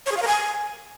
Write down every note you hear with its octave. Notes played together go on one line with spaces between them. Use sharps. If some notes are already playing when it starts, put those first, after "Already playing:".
C#5
G#4
F5
A#4
G#5